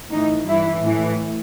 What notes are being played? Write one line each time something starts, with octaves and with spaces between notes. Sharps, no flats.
A2 E3 D#4
G2 E3 E4
A2
E3